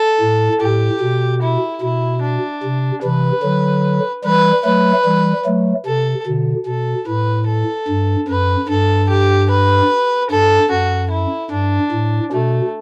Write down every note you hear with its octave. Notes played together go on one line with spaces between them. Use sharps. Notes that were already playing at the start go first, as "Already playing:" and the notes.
Already playing: A4
A2
A2 G4
B2
E4
B2 E4
D4
C3
C3 E3 B4
D3 F#3
E3 G3 B4
F#3 A3 B4
E3 G3
F#3 A3
C3 A4
B2 D3
B2 A4
A2 B4
A4
G2
F#2 B4
G2 A4
G4
B4
G2 A4
F#2 F#4
E4
G2 D4
A2
B2 A3